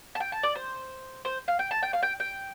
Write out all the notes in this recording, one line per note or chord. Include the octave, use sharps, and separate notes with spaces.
A5
G5
A5
D5
C5
C5
F5
G5
A5
G5
F5
G5
G5